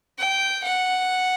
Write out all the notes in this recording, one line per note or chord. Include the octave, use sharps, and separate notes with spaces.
G5
F#5